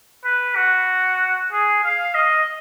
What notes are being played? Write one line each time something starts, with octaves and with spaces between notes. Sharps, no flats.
B4
F#4
G#4
F5
D#5